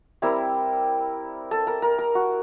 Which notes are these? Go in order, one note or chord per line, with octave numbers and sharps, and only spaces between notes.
G3 C4 E4 A#4
A4
A#4
A#4
A#4
F#4